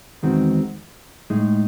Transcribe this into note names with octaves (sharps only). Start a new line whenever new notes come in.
E2 D#3 G#3 C4 F#4
A2 G#3 D#4